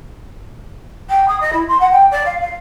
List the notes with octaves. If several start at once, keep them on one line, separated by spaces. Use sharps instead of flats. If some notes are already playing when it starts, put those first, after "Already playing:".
G5
D#6
D#5
E4
C6
F#5
G5
D5
F5
F5